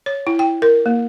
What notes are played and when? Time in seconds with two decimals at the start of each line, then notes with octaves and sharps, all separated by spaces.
0.06 C#5
0.27 E4
0.39 G5
0.62 A#4
0.86 A#3